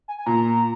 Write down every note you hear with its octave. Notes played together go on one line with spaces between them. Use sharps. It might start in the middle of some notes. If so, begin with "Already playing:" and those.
G#5
G#5
A#2 A#5